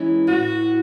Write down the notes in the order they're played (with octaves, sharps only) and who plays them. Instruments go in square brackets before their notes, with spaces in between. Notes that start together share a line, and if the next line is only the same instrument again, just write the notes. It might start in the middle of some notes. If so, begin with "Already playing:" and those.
Already playing: [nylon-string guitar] E3 G#3 C#4 E4
[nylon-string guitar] A2 [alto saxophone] F#4